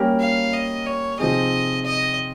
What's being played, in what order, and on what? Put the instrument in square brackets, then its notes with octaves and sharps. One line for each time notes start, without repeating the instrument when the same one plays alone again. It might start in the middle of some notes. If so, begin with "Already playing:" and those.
Already playing: [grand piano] G3 A#3 C#4 G4 A#4
[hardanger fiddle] F5
D#5
C#5
[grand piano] C3 F3 C4 D#4 G#4 [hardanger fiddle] D#5
[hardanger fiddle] D#5